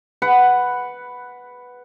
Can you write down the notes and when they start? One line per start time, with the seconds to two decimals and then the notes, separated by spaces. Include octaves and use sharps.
0.22 B4 F#5